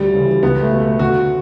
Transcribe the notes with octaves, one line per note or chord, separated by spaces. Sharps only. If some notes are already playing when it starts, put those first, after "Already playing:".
Already playing: D2 G3
C#3 E3
C#2 B3
A3
B2
A3
D2 F#4